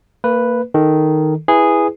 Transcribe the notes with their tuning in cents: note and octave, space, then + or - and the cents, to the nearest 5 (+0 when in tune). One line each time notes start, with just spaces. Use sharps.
A#3 -25 B4 +0
D#3 +0 A4 +0
E4 +0 G#4 -10 B4 +0